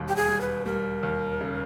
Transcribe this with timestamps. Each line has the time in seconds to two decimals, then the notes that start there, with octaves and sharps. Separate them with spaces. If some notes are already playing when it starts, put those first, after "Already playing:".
Already playing: E1 D#2 G3
0.08 G4
0.16 G#4
0.28 G3
0.41 B4
0.66 G3 A#4
1.03 D#2
1.41 C#3